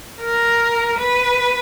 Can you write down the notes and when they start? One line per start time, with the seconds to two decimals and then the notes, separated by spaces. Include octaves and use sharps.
0.21 A#4
0.98 B4